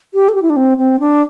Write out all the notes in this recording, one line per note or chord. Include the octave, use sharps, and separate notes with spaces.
G4
A4
G4
E4
D4
C4
C4
D4